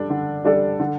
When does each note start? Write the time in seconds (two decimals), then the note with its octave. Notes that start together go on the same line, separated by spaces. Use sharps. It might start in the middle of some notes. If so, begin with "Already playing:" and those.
Already playing: G3 D4 A4 D5
0.10 D3
0.45 G3 D4 A4 D5
0.80 D3